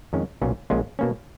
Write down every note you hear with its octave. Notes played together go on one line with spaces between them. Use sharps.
F2 D#3 G#3 C#4
B1 A#2 F#3 C#4 F4
A#1 A#2 G#3 C#4 F4
B2 A#3 C#4